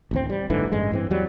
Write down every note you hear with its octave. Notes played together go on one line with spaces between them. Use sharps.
A1 D2 C4
G3
F#1 G#2 D3 E3
A1 G2 G#3
G2 E3 C4
E2 F#3 G3